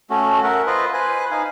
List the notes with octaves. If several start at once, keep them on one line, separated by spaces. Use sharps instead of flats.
A3 C#4 F#4
A#4 E5 F#5
F4 B4 C5 D#5
B4 C5 G#5
D#4 F5 G#5